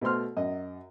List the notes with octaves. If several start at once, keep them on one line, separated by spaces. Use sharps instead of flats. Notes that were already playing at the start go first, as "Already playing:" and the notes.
B2 A3 C5 C6 F6
F#2 D#5